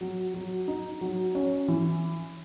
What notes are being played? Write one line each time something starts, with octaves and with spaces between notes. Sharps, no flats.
F#3
F#3
D#4
F#3
C#4
E3